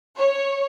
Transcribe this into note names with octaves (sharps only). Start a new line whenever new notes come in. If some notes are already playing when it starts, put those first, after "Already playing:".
C#5